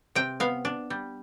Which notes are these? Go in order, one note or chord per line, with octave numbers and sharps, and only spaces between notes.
C3 G5
B3 F5
D4
G3